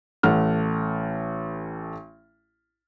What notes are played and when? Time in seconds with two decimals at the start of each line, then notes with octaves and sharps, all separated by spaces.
0.23 A1 A3 F#5 F6